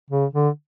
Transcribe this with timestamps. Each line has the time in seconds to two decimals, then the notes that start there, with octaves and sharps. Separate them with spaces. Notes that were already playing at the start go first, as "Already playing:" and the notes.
0.10 C#3
0.33 D3